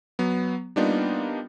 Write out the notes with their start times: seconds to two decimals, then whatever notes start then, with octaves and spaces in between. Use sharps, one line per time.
0.19 F#3 B3
0.76 G3 A#3 B3 D4 D#4 F4